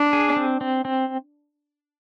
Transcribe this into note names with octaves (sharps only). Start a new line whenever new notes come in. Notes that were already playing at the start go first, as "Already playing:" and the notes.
Already playing: D4
G#4
C4
C4
C4